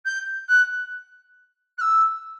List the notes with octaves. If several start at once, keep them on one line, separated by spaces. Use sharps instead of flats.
G6
F#6
F#6
E6